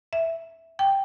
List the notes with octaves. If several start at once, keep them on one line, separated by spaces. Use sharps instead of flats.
E5
G5